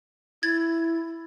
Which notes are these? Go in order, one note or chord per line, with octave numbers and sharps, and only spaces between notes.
E4 G#6 A6